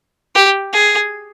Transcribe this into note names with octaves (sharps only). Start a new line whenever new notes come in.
G4
G#4